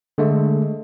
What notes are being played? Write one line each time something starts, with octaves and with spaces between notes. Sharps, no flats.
D3 G#3 A3